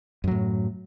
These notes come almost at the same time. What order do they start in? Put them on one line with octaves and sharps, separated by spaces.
F#2 F#3 A2